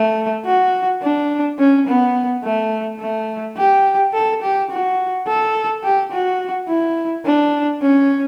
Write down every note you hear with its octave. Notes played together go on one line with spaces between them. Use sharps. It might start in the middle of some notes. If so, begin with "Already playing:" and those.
Already playing: A3
F#4
D4
C#4
B3
A3
A3
G4
A4
G4
F#4
A4
G4
F#4
E4
D4
C#4